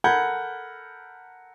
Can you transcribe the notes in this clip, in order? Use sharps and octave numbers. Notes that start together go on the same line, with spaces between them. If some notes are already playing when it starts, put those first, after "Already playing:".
A4 A#4 F#5 B5 G6 G#6